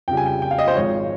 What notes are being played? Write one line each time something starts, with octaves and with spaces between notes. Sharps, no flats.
F2 C#3 G3 G5
G#5
G5
G5
F5
D#5
C5
G#1 G#2 F3 C#5